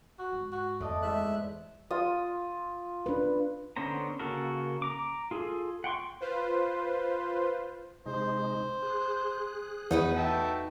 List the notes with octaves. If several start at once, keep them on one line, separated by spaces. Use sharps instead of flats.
F#4
G#2
F#4
F2 A3 D5 D#5 A5
E2 G#2 E5 F#6
F4 D#6
D4 B4
D3 B3 C#4 C5 A#5
C#3 A#3 F#4 A4 A#4
A#5 D6
F4 G#4 A4
F#5 G5 C6 C#6
F4 B4 C5
C3 G#3 D#4 C5
G#4 F#6
E2 D#4 F#4 B4
E5 G5 A5